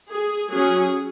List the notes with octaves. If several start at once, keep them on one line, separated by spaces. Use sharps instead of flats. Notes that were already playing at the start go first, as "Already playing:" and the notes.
G#4
F#3 C#4 G#4